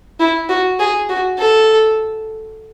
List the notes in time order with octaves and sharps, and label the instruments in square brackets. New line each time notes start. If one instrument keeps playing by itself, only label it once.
[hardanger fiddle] E4
F#4
G#4
F#4
A4